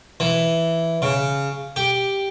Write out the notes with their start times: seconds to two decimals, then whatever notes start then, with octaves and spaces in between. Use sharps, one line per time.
0.20 E3
1.02 C#3
1.76 G4